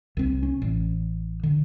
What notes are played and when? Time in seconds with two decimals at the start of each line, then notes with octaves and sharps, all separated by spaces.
0.17 C2 C4
0.43 C#4
0.62 A1
1.43 D3